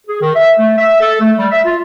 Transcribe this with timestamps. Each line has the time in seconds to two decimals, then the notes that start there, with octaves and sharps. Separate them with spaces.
0.07 G#4
0.20 D#3
0.35 E5
0.58 A3
0.78 E5
1.01 A4
1.20 A3
1.38 G3
1.50 E5
1.65 F4